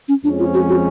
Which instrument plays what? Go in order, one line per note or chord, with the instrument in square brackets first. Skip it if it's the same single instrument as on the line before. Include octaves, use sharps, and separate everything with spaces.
[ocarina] C#4
[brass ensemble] F2 F3 G#3 C#4 [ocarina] D4
[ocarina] F4
F#4
F#4